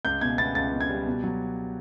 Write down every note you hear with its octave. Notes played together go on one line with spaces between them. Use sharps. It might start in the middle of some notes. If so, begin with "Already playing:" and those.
C#2 G6
B2 G#6
B3 A6
C#2 A6
B2
G#6
G3
B2
F#3